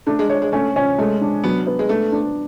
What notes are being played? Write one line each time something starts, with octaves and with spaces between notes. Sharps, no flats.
A3 D4
G#3
G#3 C#5
G#3
A3 C#4
C#4
G#3 A3
D4
F#3 B3
B3
G#3
A3 D4
D4